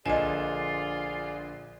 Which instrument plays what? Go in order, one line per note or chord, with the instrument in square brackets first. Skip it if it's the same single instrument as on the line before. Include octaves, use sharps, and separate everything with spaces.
[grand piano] A#1 D3 [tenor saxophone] F4 [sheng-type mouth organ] G#4 D5 [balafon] D#5 G#5